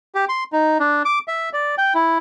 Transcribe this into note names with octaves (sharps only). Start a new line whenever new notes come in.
G4
C6
D#4
D4
D6
E5
D5
G5
E4